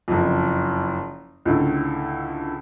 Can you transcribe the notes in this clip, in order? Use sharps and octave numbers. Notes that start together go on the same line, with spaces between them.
F#1 F2
C#2 A2 D3